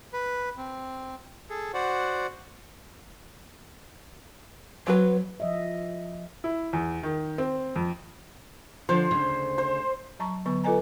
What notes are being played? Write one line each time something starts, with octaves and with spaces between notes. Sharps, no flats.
B4
C4
G#4 A4
F#4 C5 D5 F#5
F#3 C4 F#4 B4
F3 D#5 E5
E4
E2
D#3
C4
F2
D3 F3 C5
D2 C#3
C5
F#3 A5 A#5 C#6
D3 F#3 B3 C#6
F4 A4 B4 D#5 G#5 A#5